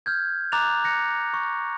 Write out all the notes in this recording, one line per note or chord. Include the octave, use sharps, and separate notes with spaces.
F6 G6 G#6
A#5 D6 F#6 A6 F7
F#6 A#6 C#7
C#6